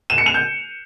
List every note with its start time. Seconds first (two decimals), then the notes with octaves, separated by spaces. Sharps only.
0.10 E7
0.18 C#7
0.26 F7
0.34 G6